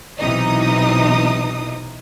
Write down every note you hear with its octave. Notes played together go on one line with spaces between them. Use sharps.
B1 C3 E3 D#4 D#6